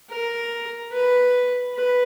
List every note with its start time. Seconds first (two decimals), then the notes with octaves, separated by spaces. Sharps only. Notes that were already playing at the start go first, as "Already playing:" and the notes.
0.10 A#4
0.92 B4
1.75 B4